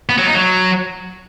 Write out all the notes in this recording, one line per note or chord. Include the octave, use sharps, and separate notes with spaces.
B3
F#3
D#4
F#3